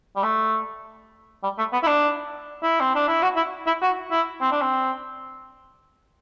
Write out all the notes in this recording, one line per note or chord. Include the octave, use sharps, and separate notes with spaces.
G3
A3
G3
A3
B3
E4
D4
E4
C4
D4
E4
F#4
E4
E4
F#4
E4
C4
D4
C4